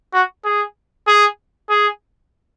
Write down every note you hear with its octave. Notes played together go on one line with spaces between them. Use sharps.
F#4
G#4
G#4
G#4